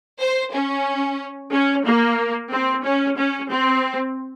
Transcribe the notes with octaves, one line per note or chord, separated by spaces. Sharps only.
C5
C#4
C#4
A#3
C4
C#4
C#4
C4